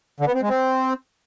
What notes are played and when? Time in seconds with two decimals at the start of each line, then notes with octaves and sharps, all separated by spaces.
0.20 D3
0.28 B3
0.35 C4
0.42 G#3
0.49 C4